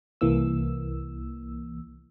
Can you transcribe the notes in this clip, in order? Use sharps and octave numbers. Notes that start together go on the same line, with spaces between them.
C2 E3 A#3 E6